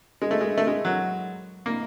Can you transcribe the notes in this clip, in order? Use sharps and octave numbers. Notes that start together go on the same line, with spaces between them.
G#3
A3
G#3
A3
G#3
F#3
A#3